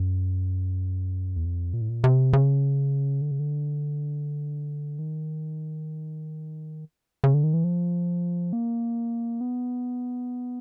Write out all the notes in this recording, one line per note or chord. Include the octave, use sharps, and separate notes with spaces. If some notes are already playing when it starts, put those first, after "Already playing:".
Already playing: F#2
E2
F2
A#2
A2
A#2
C3
C#3
D3
C#3
D3
D#3
C#3
D3
D#3
E3
F3
A#3
B3